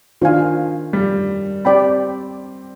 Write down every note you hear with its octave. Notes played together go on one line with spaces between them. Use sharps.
D#3 D4 F4 C5 F5 G#5
G3
C4 G4 D5 G5 B5